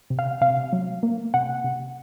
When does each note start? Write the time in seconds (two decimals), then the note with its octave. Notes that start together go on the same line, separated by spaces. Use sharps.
0.10 C3
0.19 F5
0.41 C3 F5
0.73 F#3
1.03 A#3
1.34 C3 F#5
1.64 C3